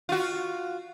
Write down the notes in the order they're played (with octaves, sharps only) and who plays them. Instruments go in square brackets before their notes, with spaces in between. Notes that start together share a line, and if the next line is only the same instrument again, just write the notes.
[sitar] F4 F#4